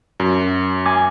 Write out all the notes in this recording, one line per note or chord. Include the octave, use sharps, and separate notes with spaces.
F#2
G#5 D6